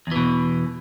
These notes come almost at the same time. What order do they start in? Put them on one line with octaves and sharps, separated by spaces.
E2 E3 B2